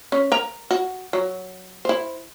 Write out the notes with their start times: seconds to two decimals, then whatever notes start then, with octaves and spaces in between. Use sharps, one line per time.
0.12 C#4
0.32 A#4 A#5
0.71 F#4
1.13 F#3
1.85 E4 C5